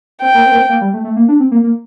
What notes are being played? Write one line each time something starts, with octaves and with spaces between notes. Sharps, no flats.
C4 G5
A#3
C4
A#3
C4
A#3
G3
A3
A3
A#3
D4
C4
A#3
A#3